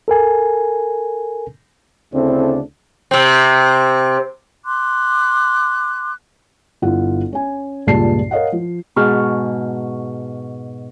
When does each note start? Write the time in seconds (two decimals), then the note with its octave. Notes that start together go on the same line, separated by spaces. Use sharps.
0.08 A4 A#4 G#5
2.13 D2 C#3 C4 D4 E4 A4
3.11 C3 C4
4.65 C6 D6 F#6
6.82 G1 E4 F4 F#5
7.33 C#4 G#5
7.87 C#2 G2 A#2 G#3 A5 C7
8.31 A#4 C#5 D#5 F5 F#5
8.52 F3
8.96 G#2 B2 F#4 G#4 A5 F6